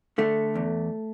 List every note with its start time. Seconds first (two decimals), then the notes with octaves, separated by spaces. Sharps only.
0.18 D3 A3
0.55 E2